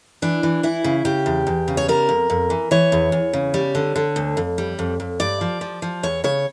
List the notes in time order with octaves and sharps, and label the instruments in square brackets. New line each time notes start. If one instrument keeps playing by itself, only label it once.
[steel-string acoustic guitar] E3 D4
E3
E3 E4
C#3
C#3 G4
E2
E2
C#3
C#5
G3 A#4
F2
F2
E3
E3 C#5
E2
E2
C#3
G3
D3
D3
D2
F2
G3
F2
F2
G2 D5
F3
F3
F3
E2 C#5
C#3 C#5